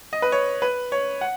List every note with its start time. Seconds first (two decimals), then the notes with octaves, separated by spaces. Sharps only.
0.13 D#5
0.22 B4
0.32 C#5
0.62 B4
0.92 C#5
1.21 F#5